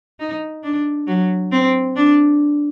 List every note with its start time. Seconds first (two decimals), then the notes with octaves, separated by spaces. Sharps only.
0.20 D#4
0.63 D4
1.07 F#3
1.52 C4
1.96 D4